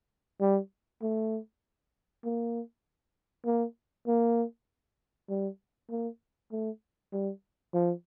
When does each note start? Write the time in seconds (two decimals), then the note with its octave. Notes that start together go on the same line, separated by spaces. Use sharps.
0.40 G3
1.02 A3
2.24 A#3
3.46 A#3
4.07 A#3
5.30 G3
5.90 A#3
6.52 A3
7.12 G3
7.74 F3